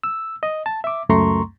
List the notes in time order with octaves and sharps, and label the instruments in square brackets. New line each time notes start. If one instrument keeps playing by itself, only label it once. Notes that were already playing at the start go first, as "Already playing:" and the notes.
[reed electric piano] E6
D#5
A5
E5 D6
C#2 F#2 A3 A#5 C6 C#6